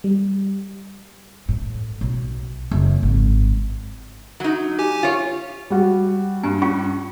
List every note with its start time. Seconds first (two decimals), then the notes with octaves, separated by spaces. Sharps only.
0.04 G3
1.49 A2
2.01 B1
2.71 F#1
3.03 G#1
4.40 F#3 D#4
4.79 G4 G#5
5.03 F4 C#5
5.70 G3 F#4
6.44 G2 G#5
6.62 C#4 F4 G4 C#6